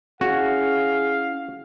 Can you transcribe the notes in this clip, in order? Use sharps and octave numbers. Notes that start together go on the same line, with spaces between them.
C#4 E4 F#4 G#4 F5